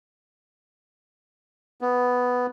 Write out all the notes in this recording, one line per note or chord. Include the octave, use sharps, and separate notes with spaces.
B3